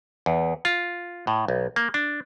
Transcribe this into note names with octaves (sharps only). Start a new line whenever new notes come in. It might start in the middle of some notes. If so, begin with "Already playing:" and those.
E2
F4
A2
B1
A#3
D4